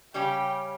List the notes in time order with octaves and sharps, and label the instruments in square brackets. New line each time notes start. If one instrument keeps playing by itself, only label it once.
[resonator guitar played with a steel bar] C#3 G3 C#4 G4 [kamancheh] G5